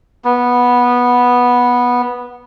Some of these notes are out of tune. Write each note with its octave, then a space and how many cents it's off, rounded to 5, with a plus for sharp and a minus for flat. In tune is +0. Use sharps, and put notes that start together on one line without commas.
B3 -10